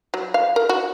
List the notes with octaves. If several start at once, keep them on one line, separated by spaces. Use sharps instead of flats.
F#3
F5
A#4
F#4